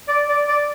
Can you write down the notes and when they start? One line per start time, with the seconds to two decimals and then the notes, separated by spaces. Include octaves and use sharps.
0.08 D5
0.29 D5
0.48 D5